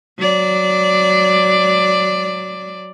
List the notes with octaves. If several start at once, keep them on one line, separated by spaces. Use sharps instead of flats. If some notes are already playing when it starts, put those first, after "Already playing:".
F#3 D5